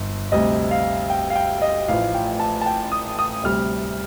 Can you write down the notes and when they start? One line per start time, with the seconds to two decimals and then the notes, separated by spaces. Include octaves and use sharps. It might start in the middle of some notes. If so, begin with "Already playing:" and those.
Already playing: G1
0.32 D2 C3 G3 D#5
0.71 F5
1.10 G5
1.30 F5
1.35 G5
1.62 D#5
1.88 A1 A2 F3 F5
2.14 G5
2.40 A5
2.61 A5
2.66 G5
2.92 D#6
3.19 D#6
3.44 D2 C3 G3 F6